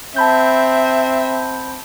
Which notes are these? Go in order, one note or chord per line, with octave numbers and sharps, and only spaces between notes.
C4 E5 A5 B5 G6